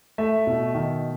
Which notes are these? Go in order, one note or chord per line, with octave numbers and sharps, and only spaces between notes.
A3 E5
B2
D#3